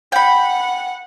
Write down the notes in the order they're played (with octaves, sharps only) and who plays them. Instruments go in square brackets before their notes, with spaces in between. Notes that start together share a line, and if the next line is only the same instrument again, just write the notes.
[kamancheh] F#5 [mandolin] G5 B5